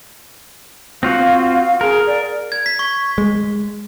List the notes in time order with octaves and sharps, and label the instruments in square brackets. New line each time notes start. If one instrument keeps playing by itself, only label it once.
[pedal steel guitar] C4 F4 F#4 [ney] F5
[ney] G#4 [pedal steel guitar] A#4
[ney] D5
[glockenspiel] G#6
B6
C#6
[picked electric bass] G#3